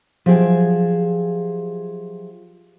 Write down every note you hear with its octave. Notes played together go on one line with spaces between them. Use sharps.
F3 F#3 G4 G#4 E5